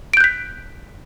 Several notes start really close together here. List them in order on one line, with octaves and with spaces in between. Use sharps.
D7 G6 F#6 B6